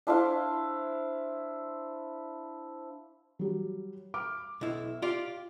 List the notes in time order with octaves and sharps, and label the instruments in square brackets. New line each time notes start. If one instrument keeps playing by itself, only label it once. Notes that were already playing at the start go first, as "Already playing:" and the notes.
[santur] D4 E4 C5 F5
[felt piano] F#3 G3
D6 F6
[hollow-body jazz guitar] B1 E4 [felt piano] D#5
[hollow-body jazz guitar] F4 G4 D5